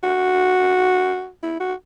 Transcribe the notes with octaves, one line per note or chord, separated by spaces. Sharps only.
F#4
E4
F#4